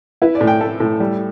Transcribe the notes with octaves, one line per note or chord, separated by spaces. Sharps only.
E4 B4
D5
A2
G5
A3 A4
A2
G3